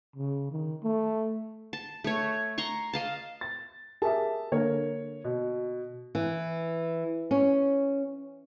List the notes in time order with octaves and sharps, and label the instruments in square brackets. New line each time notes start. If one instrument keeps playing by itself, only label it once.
[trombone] C#3
D#3
A3
[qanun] A5
A3 C#5
A#5 C6 C#6
D#5 F5 A5
[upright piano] A6
[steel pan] G4 G#4 A#4 [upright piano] E5 A5
[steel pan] D3 A#3 A#4 [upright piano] C#5
[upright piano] B2
[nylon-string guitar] E3
C#4